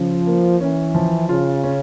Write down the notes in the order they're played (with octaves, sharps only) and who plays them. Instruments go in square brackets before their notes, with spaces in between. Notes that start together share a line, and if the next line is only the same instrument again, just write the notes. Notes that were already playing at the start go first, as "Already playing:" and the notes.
Already playing: [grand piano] C#3 [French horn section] F3
[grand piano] A#3
[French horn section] E3 [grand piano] C#4
[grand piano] F3
[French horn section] C#3 [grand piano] F4
[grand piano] C#4